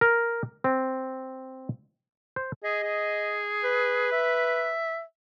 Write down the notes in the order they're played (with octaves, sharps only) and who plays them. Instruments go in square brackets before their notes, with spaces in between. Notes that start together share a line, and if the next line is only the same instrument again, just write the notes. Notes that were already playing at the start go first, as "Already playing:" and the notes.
[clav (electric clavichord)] A#4
C4
C5
[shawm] G#4 [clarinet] D#5
[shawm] G#4
[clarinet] B4
[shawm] E5